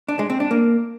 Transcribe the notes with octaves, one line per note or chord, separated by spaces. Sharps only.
D4
G#3
C4
D4
A#3